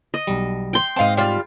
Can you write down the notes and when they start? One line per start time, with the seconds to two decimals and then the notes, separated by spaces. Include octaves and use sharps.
0.14 D#5
0.27 B1 G3
0.73 G5 C6
0.96 G#2 C4 D#5 F5 A5
1.17 G3 F4